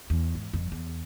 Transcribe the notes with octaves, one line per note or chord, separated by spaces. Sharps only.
E2
G#2
F#1 F2
E2